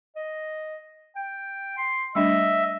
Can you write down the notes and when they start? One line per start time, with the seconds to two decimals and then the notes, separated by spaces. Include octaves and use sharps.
0.16 D#5
1.16 G5
1.77 C6
2.15 G3 A3 D4 D#5 E5